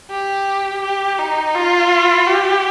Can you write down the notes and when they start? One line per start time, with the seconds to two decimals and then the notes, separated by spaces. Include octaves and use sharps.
0.10 G4
0.82 G4
1.18 D#4
1.55 F4
2.27 G4